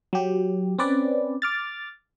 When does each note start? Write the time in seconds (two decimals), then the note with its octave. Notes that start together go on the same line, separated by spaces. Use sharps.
0.13 F#3 G4
0.79 C4 C#4 B4 D5
1.42 D6 F6 A6